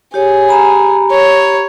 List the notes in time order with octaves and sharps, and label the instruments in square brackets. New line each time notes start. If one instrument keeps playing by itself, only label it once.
[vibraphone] G4 C#5 [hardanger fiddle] G#4
[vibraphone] G4 A#5 B5
[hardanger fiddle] C#5